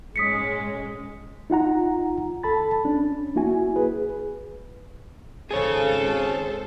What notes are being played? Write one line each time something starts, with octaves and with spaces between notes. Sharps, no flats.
D#1 G#2 G#3 C#4 D#6 B6 C#7
D#4 F4 F#5 A#5
D#2 A4 A5 B5 A6
C#4 D4
A#3 E4 F#4 G#5
G#4 B4
G#1 G#4 A4 C5 C#5